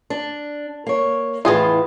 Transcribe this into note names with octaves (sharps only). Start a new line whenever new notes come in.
D4
A#3 C#5
E2 A2 E3 F4 G#4